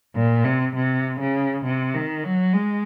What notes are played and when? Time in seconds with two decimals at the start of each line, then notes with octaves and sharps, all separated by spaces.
0.15 A#2
0.44 C3
0.75 C3
1.20 C#3
1.65 C3
1.94 D#3
2.24 F#3
2.54 G#3